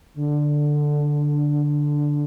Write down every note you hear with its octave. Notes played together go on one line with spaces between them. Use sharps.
D3